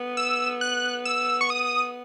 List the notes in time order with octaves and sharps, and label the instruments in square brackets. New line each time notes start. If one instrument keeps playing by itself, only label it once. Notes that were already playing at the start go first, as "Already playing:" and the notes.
Already playing: [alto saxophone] B3
[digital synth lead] E6
F#6
E6
C#6
D#6